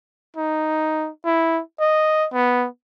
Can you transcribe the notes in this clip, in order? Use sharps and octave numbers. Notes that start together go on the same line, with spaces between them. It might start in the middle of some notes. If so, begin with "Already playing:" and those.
D#4
E4
D#5
B3